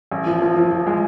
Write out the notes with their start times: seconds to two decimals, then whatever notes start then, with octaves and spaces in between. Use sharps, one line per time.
0.12 A1
0.26 F3
0.42 F3
0.56 F3
0.71 F3
0.87 G#3